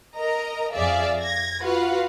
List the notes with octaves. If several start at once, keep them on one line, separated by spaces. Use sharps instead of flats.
A#4 D#5 A#5
F2 G#4 D5 E5 F5
G#6 A#6
F4 F#4 B4 F5 F#5